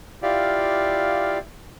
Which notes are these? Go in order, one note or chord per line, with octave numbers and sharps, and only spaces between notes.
E4 F4 G4 D5 F5